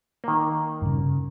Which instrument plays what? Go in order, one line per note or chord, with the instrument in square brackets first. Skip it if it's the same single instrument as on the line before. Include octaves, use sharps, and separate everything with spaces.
[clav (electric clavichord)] D#3 A#3
[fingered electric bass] G2 C#3